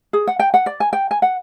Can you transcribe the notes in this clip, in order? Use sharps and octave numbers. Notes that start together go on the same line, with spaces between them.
G#4
F#5
G5
F#5
D5
G#5
G5
G#5
F#5